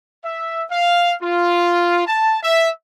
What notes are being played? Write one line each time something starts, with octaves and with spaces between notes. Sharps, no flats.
E5
F5
F4
A5
E5